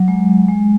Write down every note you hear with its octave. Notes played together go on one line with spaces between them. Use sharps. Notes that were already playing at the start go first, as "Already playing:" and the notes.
Already playing: F#3
G#3
G#3